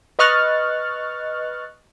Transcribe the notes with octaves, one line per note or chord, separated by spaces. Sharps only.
B4 D#5 C#6 F6 F#6 A6